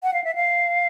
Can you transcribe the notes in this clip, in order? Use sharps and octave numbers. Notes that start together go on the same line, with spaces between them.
F#5
F5
E5
F5